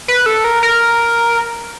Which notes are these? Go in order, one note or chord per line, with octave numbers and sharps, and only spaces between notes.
B4
A4
A#4
A#4